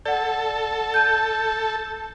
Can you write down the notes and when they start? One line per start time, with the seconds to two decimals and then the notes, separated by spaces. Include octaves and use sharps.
0.05 A4 D5 F#5
0.94 A5 G6